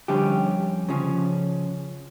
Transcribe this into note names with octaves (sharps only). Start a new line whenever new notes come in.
F2 D3 G3 C#4 G4
C#3 F3 C#4